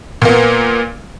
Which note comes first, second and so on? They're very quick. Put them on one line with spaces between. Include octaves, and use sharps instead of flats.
A#2 A#3 B3